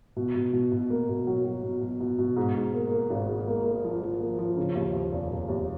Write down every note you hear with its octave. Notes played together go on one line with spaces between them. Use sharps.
B2
B2
B2
B2
A#3
B2
F#3
F#3
B2
B2
B2
B2
G#2
G#2
A#3
A#3
G#1
G#2
A#3
A#3
F3
F3
A#3
F3
C#3
D#2
D#2
F1
F1
D#2